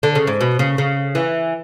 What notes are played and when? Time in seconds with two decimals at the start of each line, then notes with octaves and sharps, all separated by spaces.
0.03 D3
0.15 C#3
0.27 G#2
0.41 B2
0.59 C#3
0.78 C#3
1.15 E3